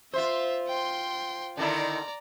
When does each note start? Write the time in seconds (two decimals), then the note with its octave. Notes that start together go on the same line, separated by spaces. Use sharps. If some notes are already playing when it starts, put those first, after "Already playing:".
0.13 F4 C5 E5
0.68 G5 C6
1.57 D3 D#3 E4 D5 A#5